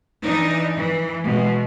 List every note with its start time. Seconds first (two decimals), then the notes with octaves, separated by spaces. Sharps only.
0.23 E3 D4 D#4
0.75 E3
1.23 B2 G#3